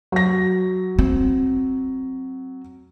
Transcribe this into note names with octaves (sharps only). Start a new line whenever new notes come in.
F#3 A#6
C4